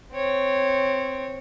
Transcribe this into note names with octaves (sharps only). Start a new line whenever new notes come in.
C4 C#5